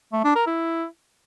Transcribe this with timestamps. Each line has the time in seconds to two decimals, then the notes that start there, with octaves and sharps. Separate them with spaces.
0.13 A3
0.24 D4
0.35 A#4
0.47 E4